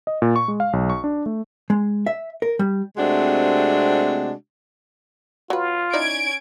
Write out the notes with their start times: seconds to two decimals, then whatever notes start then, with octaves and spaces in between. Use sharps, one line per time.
0.07 D#5
0.22 A#2
0.36 C#6
0.48 G#3
0.60 F5
0.73 B1
0.90 C#6
1.04 D4
1.26 A3
1.70 G#3
2.06 E5
2.42 A#4
2.59 G3
2.97 C3 G#3 A3 C4 D4 F#4
5.50 F#3 F4 B4
5.93 C#4 D#4 E4 D5 G#6 D7